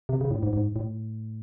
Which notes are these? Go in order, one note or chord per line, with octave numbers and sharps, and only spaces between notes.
C3
C#3
A2
G#2
G#2
A2